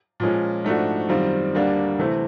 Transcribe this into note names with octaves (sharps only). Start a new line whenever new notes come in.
A#2 F3 G#3 C#4
G#2 F3 A3 D4 F#4
F#2 D#3 G3 C4 F4
D2 D3 G3 A#3 D4
C3 E3 A3 C4